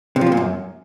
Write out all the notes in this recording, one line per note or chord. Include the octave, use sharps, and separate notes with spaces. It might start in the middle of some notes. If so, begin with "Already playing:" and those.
C3
F3
C3
A#2
F#2